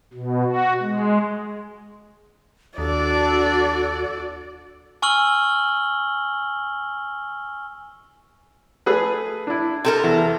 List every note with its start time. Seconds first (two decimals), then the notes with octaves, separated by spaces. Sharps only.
0.13 B2
0.44 F#4
0.81 G#3
2.78 D#2 D4 F#4 A4 D5
5.02 G#5 C#6 E6 F6 F#7 G7
8.86 A3 G#4 B4
9.47 D4 E4
9.85 C3 A4 A#4
10.04 E2